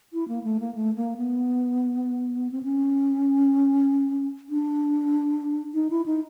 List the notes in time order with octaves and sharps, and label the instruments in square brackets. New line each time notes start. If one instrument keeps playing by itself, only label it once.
[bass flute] E4
A#3
A3
A#3
A3
A#3
B3
C4
C#4
D4
D#4
E4
D#4